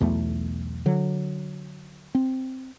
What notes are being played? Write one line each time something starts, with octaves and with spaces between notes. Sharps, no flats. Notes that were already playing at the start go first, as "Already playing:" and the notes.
B1 E2 A3
D3 F#3
C4